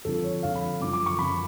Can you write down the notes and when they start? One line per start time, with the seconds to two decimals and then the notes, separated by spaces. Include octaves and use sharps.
0.05 F2 D3 F3 A4
0.24 C#5
0.43 F2 D3 F3 F5
0.55 B5
0.81 F#2 D3 F3 D6
0.93 D6
1.06 C#6
1.19 F#2 D3 F3 B5